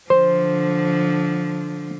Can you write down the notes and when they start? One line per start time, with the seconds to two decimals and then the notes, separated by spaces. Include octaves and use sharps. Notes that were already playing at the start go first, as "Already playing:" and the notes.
0.10 D3 F3 C5